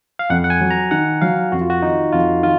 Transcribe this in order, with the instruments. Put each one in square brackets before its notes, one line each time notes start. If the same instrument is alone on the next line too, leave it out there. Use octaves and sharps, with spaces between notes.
[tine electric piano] F5
[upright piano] F2 [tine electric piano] F#5
[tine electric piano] F#5
G#5
[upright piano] F#3
[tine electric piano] A#5
[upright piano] D#3 [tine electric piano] F#5
[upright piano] F#3 [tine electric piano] F5
[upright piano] F2 [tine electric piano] F#4
[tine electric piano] F4
F#4
[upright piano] D#3 [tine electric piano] D#4
[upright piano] F2 [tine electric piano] F4
[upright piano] D#3 [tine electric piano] F4